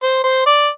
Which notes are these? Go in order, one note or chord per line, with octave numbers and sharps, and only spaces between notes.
C5
C5
D5